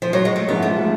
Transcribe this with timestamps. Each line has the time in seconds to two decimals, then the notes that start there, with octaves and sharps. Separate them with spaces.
0.02 F3
0.13 F#3
0.25 G#3
0.36 A3
0.48 G#2 F3 G#3 B3
0.62 A3
0.78 F3 G#3